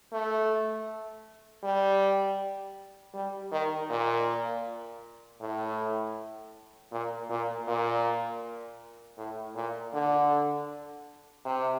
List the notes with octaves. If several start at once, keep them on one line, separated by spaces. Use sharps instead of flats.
A3
G3
G3
D#3
A#2
A2
A#2
A#2
A#2
A2
A#2
D3
C3